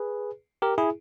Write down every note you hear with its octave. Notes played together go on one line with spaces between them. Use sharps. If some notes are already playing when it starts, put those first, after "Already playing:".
Already playing: G#4 B4
G4 A#4
E4 G#4